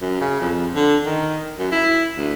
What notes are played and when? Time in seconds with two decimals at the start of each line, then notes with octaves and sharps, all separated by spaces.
0.01 F#2
0.21 C#3
0.41 F2
0.75 D3
1.05 D#3
1.59 F#2
1.72 E4
2.17 D2